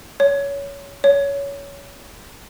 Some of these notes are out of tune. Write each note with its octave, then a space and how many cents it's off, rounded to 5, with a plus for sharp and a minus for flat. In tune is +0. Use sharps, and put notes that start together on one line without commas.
C#5 +20
C#5 +20